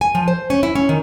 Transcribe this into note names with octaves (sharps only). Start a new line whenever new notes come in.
G#5
F3
C5
C#4
E4
C#4
D#3